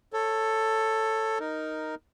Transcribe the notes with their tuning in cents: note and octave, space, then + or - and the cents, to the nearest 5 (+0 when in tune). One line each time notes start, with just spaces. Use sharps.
A4 +10 C#5 -10
D#4 +0 A#4 +0